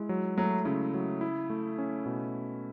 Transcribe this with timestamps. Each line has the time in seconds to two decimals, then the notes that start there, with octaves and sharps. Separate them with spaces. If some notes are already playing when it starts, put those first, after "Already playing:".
Already playing: G#3 E4
0.09 F#3
0.38 F#3 A3
0.65 C#3 E4
0.94 F#3
1.21 E4
1.50 A3
1.78 C#4
2.06 B2